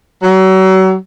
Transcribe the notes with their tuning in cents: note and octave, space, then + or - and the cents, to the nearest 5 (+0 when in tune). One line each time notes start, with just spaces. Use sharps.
F#3 +35